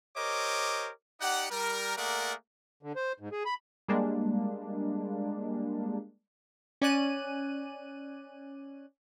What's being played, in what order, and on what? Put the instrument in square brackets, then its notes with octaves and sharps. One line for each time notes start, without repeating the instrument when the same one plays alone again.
[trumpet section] G4 A#4 C5 C#5 D#5 D6
D#4 G4 D5 F#5
G3 A#4
A3 A#3 G#4 A#4 D5 F#5
[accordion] D3
C5
G#2
G#4
B5
[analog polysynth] G3 G#3 A#3 D4
[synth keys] C#4 D5 G#5 F#6 D#7